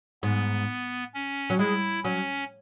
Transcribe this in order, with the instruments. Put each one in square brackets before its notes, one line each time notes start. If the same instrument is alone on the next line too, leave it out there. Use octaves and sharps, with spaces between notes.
[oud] G#2 [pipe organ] B3
[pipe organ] C#4
[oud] F#3
[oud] G#3 [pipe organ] E4
[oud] F#3 [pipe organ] C#4